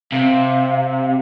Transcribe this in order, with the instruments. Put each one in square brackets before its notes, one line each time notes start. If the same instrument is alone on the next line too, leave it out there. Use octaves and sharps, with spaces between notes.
[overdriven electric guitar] C3 [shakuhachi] F5